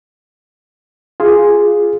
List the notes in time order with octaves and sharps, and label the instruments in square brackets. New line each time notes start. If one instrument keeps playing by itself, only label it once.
[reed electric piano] F4 G#4